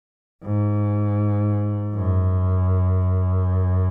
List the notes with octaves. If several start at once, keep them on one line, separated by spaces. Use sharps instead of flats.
G#2
F#2